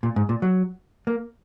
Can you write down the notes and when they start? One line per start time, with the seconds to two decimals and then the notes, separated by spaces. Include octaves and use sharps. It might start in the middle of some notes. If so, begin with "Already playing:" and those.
0.03 A#2
0.16 G#2
0.29 A#2
0.42 F#3
1.07 A#3